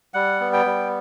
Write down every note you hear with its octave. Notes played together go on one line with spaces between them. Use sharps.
G3 F#5
B3
G5
G3